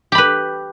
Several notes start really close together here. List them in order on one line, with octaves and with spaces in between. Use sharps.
G4 B5 B4